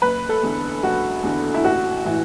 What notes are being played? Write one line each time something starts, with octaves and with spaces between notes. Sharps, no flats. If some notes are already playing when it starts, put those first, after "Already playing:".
F#1 B4
A4
E2 D3
F#1 F#4
E2 D3
E4
A1 F#4
A2 E3